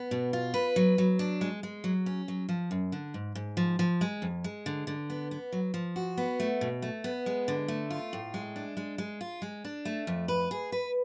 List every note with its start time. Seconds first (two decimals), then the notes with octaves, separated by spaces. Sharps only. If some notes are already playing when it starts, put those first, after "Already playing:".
Already playing: B3
0.11 B2
0.33 F4
0.54 B4
0.76 F#3
0.98 F#3
1.19 D4
1.41 G#3
1.63 G#3
1.84 F#3
2.06 C#4
2.28 F#3
2.49 F3
2.71 F#2
2.92 D3
3.14 G#2
3.35 G#2
3.57 F3
3.79 F3
4.01 G#3
4.22 F2
4.44 G#3
4.66 D3
4.87 D3
5.10 B3
5.31 B3
5.52 F#3
5.74 F3
5.96 F#4
6.17 B3
6.40 A3
6.61 B2
6.82 A3
7.04 B3
7.26 G#3
7.48 D3
7.68 A3
7.90 F4
8.13 A2
8.34 G#3
8.56 D4
8.77 G#3
8.98 G#3
9.21 F4
9.42 G#3
9.64 D4
9.85 A3
10.07 F2
10.28 B4
10.51 G#4
10.72 B4